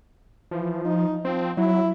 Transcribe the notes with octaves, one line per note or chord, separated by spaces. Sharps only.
E3 F3
D#4
F3 C4
F#3 E4